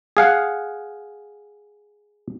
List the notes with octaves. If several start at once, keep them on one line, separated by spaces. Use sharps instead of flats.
G#4 F5 F#5